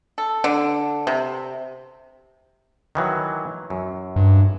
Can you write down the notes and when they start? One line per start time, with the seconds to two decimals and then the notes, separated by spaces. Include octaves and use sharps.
0.18 A4
0.44 D3
1.07 C3
2.95 D#3 E3 F#3
3.70 F#2
4.16 G2